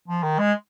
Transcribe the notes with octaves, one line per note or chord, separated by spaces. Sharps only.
F3
D#3
G#3